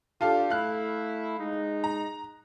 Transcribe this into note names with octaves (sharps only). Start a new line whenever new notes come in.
D4 F4 G4 A4 F5
A3 E4 F5 F#6
G#3 D#4
A#5